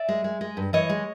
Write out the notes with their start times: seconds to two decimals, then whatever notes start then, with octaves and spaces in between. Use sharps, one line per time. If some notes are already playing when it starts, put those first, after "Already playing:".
Already playing: D5 E5
0.09 G#3
0.24 G#3
0.41 G#3
0.57 G2
0.73 E3 C#5 D#5
0.89 G#3